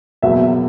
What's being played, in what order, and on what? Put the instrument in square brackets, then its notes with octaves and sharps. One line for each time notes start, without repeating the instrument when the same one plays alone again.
[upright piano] E2 B2 F#3 A#3 E5